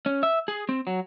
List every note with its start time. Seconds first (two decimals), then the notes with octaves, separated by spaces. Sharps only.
0.06 C#4
0.23 E5
0.48 G#4
0.69 C4
0.87 F#3